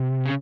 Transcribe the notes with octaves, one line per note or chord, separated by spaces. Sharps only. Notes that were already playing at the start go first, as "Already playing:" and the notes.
Already playing: C3
C#3